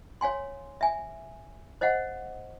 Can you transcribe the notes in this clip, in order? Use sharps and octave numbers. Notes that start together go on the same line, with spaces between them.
C#5 F5 G#5 C6
E5 G#5
C5 D#5 F5 F#5